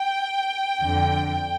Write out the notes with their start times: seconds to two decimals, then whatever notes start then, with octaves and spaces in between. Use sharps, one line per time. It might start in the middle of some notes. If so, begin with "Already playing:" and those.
Already playing: G5
0.80 F2 D3